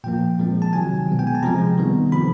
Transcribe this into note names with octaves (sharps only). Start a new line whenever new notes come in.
A#2 F3 A#3 G5
A#2 F3 G#3 C4
A5
C3 D#3 F#3 G#5
B2 G#3 B3
G5
G#5
A5
C3 F3 G#3 C4 A#5
D#3 G3 B3
C3 F3 A3 C4 B5